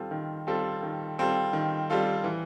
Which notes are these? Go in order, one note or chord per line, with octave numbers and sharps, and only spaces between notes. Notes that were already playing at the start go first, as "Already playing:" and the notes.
Already playing: D#3 G3 C4 F4 A4
D#3
G3 C4 F4 A4
D#3
G3 C4 F4 A4
D#3
G3 C4 F4 A4
E3